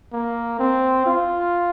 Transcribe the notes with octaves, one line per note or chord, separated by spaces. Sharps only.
A#3
C4
F4